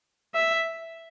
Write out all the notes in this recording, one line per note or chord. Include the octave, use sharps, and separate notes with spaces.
E5